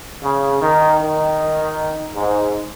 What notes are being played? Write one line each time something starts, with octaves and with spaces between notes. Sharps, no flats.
C#3
D#3
D#3
G#2